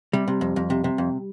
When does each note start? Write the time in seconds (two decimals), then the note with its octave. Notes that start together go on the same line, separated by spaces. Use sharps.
0.13 C3 G3
0.28 C3
0.41 F2
0.56 F2
0.70 C3
0.84 C3
0.98 F2